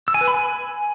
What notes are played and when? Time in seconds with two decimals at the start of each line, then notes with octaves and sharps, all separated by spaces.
0.08 E6
0.14 G#5
0.21 B4
0.28 B5
0.34 G#5